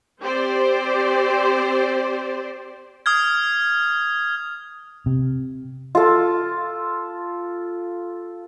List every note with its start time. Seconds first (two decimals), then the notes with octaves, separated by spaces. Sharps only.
0.22 C4 G4 C5 D5
3.06 D#6 F6 G#6
5.06 C3
5.95 F4 A4